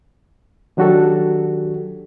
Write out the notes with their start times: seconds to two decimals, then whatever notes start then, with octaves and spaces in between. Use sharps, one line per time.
0.77 D#3 F#3 D4 F#4 G4 A4